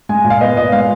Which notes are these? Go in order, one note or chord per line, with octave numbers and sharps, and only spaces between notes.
G#3 G#5
A#2
F5
B3 D#5
A#2 D#5
G#3 F5